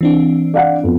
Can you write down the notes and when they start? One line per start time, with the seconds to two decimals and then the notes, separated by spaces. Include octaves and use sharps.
0.01 E3 C4 D4
0.54 D5 F5 F#5
0.83 F2 B3